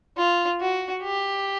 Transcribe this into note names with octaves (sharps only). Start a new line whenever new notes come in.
F4
F#4
G4